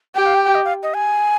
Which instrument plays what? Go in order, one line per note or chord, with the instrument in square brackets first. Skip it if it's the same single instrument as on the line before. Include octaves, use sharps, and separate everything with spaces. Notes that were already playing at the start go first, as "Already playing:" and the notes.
[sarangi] G4 [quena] G5
[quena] F5
G5
G5
D#5
F5
D#5
G#5